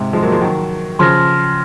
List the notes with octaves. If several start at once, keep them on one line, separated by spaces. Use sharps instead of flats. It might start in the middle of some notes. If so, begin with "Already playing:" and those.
Already playing: G#2 C3
F3 G#3
F#3 A#3
F3 G#3
D#3 F#3
C#3 F3 C6 F6 A#6